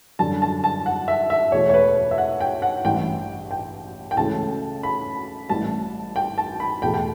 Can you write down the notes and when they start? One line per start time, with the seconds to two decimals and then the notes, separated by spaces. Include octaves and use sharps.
0.19 F#2 D3 G3 A5
0.42 A5
0.64 A5
0.86 F#5
1.08 E5
1.30 E5
1.52 E2 B2 A3 C#5
1.69 C#5
1.74 B4
1.96 B4
2.11 E5
2.18 F#5
2.40 G5
2.62 F#5
2.85 A1 G2 E3 G5
3.51 G5
4.11 G5
4.17 C#2 C#3 E3 A3 A5
4.83 B5
5.49 A1 A2 G3 A5
6.16 G5
6.38 A5
6.60 B5
6.82 E2 B2 A3 G5
6.94 G5